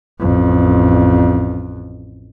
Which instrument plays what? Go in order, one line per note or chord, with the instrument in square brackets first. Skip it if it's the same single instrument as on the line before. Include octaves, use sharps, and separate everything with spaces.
[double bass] A1 F2